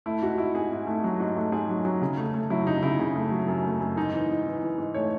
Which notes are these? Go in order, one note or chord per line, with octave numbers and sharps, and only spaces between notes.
A3 E4
G#2 F#4
G#2 E4
G#2 G#4
G#2
A3
F#3
G#2
A3
G#2 G#4
F#3
F#3
C#3
A3
A3
F#3 E4
C#3 D#4
C#3 E4
C#3
A3
F#3
F#2
A3
F#2
G#2 D#4
E3
G#2
E3
E3
G#2
A3 C#5